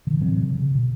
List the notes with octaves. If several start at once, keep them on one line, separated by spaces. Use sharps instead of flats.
D3 D#3
A2 E3 F#3 C4
C3
C#3
B2